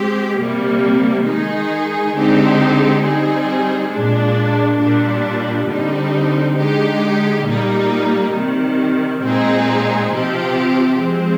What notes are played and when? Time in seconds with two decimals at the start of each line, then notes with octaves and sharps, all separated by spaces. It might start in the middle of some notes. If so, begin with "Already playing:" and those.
Already playing: G#3 C4 G4
0.39 C3 G3 A#3
1.28 D#3 G#3 D#4 G#4
2.16 D3 G#3 C4 D#4 G4
3.04 G3 C4 D#4 G#4
3.93 A#2 G#3 D4
4.81 A#2 G3 D4
5.69 D3 G3 C4 D#4
6.58 D3 G#3 D#4 G4
7.47 A#2 G3 A#3 D#4
8.35 C3 D#3 G3
9.24 A#2 G#3 C4 D#4 G#4
10.12 C3 F3 C4 G4
11.00 F3 G#3 C4